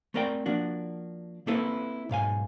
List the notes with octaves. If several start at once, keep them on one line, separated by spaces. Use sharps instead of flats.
A3 C4 A#4 D5 F#5 G5
F3 A#3 D4 F#4
A#3 C4 E4 A4 B4
B1 G#2 F5 G#5